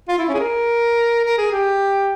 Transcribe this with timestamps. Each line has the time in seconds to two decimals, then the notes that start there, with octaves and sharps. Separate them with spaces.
0.08 F4
0.18 E4
0.29 C#4
0.34 G#4
0.40 A#4
1.24 A#4
1.38 G#4
1.52 G4